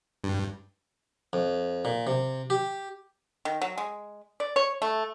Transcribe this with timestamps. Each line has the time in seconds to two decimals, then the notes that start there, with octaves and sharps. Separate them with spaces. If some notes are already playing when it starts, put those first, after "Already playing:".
0.24 G2
1.33 F2
1.85 A#2
2.07 C3
2.50 G4
3.45 D#3
3.62 F#3
3.78 G#3
4.40 D5
4.56 C#5
4.82 A3